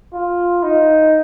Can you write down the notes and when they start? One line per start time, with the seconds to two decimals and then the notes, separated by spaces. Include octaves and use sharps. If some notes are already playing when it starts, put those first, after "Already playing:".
0.13 F4
0.63 D#4